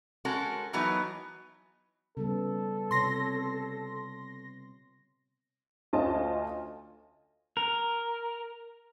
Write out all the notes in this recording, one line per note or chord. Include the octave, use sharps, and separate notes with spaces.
G#3 C#4 F#4 A4 A#4
E3 F#3 B3 D#4
C#3 G3 B3 A4
C3 F4 C#5 C6 A#6
D2 C#4 F4 D#5 A5
A#4